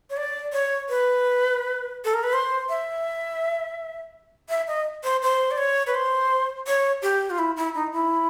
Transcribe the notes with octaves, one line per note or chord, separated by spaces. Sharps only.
C#5
D5
C#5
B4
A4
A#4
B4
C5
E5
E5
D#5
C5
C5
D5
C#5
B4
C5
C#5
G4
F4
E4
E4
D#4
E4